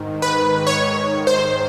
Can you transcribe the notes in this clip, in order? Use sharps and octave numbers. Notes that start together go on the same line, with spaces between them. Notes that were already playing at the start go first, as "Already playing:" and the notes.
Already playing: G#2 D#3
B4
C#5
C5